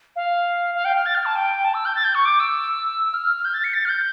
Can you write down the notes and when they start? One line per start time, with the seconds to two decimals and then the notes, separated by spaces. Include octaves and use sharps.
0.16 F5
0.75 F5
0.85 G5
0.95 F6
1.06 A6
1.15 F6
1.26 A5
1.36 G5
1.64 A5
1.74 E6
1.85 G6
1.95 A6
2.04 G6
2.15 C#6
2.25 D6
2.40 E6
3.14 F6
3.36 F6
3.45 G6
3.54 A6
3.64 C#7
3.74 A6
3.85 F6
3.89 G6